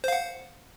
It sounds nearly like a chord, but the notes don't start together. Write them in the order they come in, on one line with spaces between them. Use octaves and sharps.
C5 F5 F#5